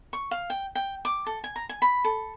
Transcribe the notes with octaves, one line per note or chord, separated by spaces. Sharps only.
C#6
F5
G5
G5
D6
A4
G#5
A#5
G#5
B5
A4